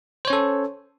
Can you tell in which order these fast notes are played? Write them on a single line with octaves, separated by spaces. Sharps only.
C5 C#5 C#4 A4